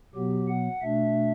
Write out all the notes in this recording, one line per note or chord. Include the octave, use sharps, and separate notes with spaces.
B2 F#3 B3 G4
F#5
B2 A3 D4 E5